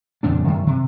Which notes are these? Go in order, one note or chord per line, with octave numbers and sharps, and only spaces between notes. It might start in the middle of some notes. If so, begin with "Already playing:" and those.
D#1 F2 C#3 D4
F#2 D#3
C3